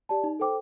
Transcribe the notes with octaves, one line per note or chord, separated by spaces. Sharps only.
G4 D5 A5
D#4
A4 C5 G5 D6